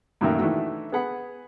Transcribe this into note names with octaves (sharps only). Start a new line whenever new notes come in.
F#2 A#2 D#3 F#3 A3 A#3
D#3 E3 A3 D4 F#4
B3 G#4 F#5 B5